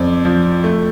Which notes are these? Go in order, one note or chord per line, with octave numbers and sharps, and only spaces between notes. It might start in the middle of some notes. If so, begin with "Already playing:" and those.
Already playing: F2 F3 C5 D5
F3
A3